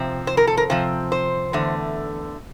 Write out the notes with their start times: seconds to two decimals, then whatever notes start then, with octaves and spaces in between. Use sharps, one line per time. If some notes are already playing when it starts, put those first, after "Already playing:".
Already playing: C3 F3 C4
0.27 C5
0.37 A#4
0.47 A4
0.57 A#4
0.70 C3 F3 C4 C5
1.12 C5
1.53 E2 D3 A3